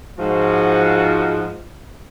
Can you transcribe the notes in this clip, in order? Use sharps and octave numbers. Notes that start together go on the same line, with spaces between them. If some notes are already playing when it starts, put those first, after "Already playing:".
G#2 F3 F#4